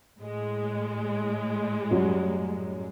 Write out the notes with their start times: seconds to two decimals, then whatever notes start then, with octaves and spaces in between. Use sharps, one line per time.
0.19 A2 G#3
1.91 F#2 F#3 G3